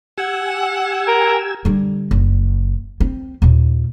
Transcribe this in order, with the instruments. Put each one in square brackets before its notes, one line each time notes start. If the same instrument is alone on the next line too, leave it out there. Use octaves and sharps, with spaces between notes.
[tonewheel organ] G4 G#5 E6 [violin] F#5
[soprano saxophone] A#4
[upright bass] D3 G3
F#1
C4
D#2 A#2